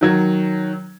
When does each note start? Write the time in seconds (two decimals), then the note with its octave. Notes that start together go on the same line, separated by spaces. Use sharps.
0.01 D#3 F#3 G#6